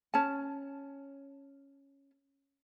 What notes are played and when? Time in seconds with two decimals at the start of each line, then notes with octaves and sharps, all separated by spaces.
0.14 C#4 A5